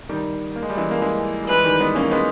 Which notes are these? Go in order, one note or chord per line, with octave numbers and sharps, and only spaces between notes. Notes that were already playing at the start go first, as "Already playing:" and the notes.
D#3 G3
A#3
G#3
G3
E3 G#3
A#3
E3 G#3
G3
E3 G#3 B4
D#3 G3
G#3 B3
A#3 C#4
G#3 B3